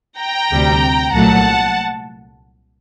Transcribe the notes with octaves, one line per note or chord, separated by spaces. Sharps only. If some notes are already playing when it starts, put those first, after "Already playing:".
G5 A#5
D2 C3 G3
C2 A#2 F#3 A3 F#5 A5